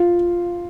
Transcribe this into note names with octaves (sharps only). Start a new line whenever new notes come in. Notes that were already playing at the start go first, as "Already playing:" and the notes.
Already playing: F4